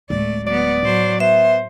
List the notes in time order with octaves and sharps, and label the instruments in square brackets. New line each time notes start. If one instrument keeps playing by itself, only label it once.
[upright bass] D1 G#3 [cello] A3 D5
[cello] F#3 B3 [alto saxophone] D5
[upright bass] A2 [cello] F#3 C5
[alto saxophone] B3 [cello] C5 [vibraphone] E5